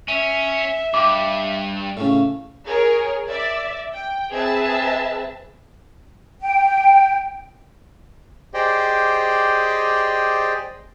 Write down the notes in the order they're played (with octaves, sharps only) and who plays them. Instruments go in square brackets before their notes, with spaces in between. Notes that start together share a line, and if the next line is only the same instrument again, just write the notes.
[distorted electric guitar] C#4 [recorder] E5
[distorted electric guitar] G2 [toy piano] D6
[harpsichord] A2 C#3
[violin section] G#4 A#4 C#5
D5 E5
G5
C4 G#4 B4 E5 A5
[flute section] G5
[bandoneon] G4 G#4 C5 D5 D#5 G5